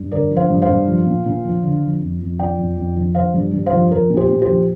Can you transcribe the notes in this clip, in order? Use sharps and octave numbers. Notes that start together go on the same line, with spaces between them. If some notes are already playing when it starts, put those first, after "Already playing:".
Already playing: G2
D3 A#4 D5
F3
C5 F5
G2
C5 F5
G2
F3
A#2
A#2
F3
D3
F3
F2
F2
F3 D5 G5
F2
F2
F3
F3 C5 F5
G2
G2
C5 F5
F3
F3 A#4
A#2
G4 C5
A#2
G4 C5
F3